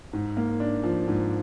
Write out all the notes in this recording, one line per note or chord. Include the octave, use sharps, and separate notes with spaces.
G#2
A#3
D4
F3
G#2